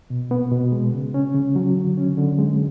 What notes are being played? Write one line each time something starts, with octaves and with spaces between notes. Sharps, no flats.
B2
B3
B2
G#3
C#3
C#4
C#3
F#3
D3
C#4
D3
G#3